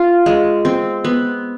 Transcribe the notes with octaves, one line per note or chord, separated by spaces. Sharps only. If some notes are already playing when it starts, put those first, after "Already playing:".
Already playing: F4
G#3
C4
B3